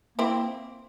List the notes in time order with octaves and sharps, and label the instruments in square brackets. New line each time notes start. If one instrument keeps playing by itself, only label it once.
[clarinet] A#3 [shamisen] C4 E4